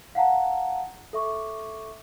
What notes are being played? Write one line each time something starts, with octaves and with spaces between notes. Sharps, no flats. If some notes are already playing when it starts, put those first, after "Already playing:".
F5 F#5 A5 A#5
A4 E5 C#6 D6